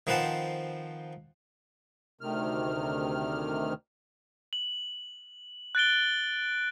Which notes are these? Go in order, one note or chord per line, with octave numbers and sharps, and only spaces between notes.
D#3 F3 C4 B4 F#5 A5
D2 C3 D#3 F6
F#7
F#6 A6 D7 G7